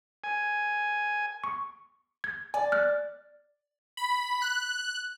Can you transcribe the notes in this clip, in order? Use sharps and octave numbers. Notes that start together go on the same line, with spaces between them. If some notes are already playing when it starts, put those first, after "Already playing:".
G#5
C#6
G#6
D5 G#5
F6 F#6
B5
F#6